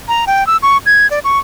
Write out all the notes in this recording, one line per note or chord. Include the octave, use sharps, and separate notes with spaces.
A#5
G5
E6
C#6
G#6
D5
C#6